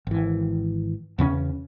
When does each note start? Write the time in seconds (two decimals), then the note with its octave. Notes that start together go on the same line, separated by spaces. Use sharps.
0.07 G#1 E3
1.18 E2 C#3 B3 C#4